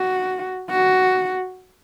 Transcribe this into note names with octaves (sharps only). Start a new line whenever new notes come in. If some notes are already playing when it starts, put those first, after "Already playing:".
Already playing: F#4
F#4